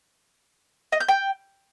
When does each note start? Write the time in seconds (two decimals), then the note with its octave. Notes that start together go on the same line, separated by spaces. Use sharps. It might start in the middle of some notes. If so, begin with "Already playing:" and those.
0.92 D#5
1.00 G6
1.08 G5